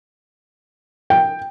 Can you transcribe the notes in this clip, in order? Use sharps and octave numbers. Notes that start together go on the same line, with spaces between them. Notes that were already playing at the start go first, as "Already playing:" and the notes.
G5